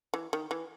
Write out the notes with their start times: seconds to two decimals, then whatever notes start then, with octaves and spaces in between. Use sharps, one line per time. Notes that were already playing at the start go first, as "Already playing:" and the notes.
0.14 E3
0.33 D#3
0.51 E3